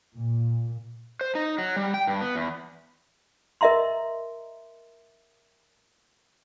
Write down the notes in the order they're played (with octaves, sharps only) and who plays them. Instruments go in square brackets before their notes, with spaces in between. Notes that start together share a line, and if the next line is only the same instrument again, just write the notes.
[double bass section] A#2
[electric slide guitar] C5
D#4
F#3
G3
G5
G2
B3
E2
[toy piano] A#4 D#5 E5 A#5 C6